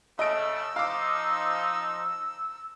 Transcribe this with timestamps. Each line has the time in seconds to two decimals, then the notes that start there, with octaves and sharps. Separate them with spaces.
0.19 C#3 A3 D#5 E6 D7
0.76 F3 D#4 F5 D6